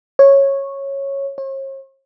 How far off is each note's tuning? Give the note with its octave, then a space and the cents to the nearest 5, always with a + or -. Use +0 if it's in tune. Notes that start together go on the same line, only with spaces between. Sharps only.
C#5 -10
C#5 -45